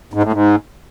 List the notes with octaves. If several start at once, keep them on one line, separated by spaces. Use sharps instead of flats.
G#2
A2
G#2